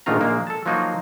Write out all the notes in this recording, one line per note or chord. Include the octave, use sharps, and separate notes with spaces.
A#1 G#2 D#3 A3 F4 A#5
A#1 G#3 A#3
A4 A5
F3 F#3 A#3 D#4 F4 F#4